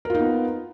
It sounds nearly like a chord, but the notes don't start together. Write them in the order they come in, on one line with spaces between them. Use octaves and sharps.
A#4 F4 D#4 B3